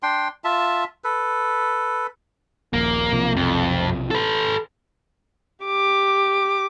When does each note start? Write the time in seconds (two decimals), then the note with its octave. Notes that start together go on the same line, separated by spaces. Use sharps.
0.03 D4 G5 C6
0.44 F4 E5 A5
1.04 A4 B4
2.73 D#1 A#1 A#3
3.11 B1 C3 F3
3.36 F2
4.11 A4 B4
5.65 G4 D6